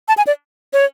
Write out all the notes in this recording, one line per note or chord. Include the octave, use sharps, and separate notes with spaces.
A5
G#5
D5
C#5